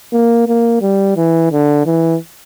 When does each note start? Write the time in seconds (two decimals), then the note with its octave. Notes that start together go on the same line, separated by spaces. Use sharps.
0.13 A#3
0.48 A#3
0.82 G3
1.17 E3
1.52 D3
1.86 E3